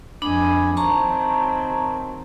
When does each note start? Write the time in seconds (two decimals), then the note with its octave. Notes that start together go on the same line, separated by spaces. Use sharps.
0.22 F2 D4 D#5 G#5 B5
0.77 D#3 F#3 C4 A5 A#5 C#6